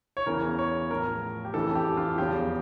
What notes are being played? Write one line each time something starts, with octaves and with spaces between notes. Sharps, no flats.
C#5
E2 C#3 E3 A#4
C#5
A2 F3 A#4
G4
F2 C#3 E3 A4
G4
F4
E2 C#3 F3 G4